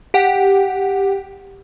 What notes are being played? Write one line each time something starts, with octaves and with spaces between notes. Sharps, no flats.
G4 F#5 G5